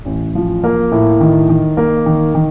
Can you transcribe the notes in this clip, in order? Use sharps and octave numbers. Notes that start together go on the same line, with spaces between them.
A1
F3
A#3
A2
D#3
D#3
A#3
D#3
D#3